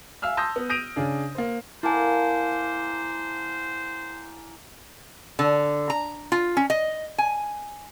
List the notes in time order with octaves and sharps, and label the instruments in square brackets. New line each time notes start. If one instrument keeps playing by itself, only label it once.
[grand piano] E5 F5 G#5 E6 F6
A5 C6 D#6 E6 G6 A#6
B3
D#6 G6 A#6 D7 D#7 F7
C#3 D4 G#4
A#3 C5
[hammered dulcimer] A#3 F#5 A5 [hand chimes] E4 G#5 [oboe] C5
[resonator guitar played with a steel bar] D3
A#5
F4
C#4
D#5
G#5